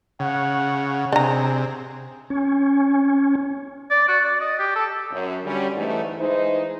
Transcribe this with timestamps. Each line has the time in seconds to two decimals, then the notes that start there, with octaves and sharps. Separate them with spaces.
0.20 C#3 F#5
1.12 C3 D4 G#4 A#5
2.30 C#4
3.91 D5
4.08 F#4
4.24 D5
4.41 D#5
4.59 G4
4.76 A4
5.12 F#2
5.44 D3 G3 C#4
5.75 G#2 E3 A3
6.18 E3 G#3 D#4 C5